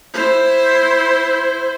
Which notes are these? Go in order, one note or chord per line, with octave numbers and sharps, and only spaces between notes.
E4 C5